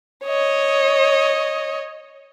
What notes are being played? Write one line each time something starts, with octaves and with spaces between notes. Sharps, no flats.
C#5 D#5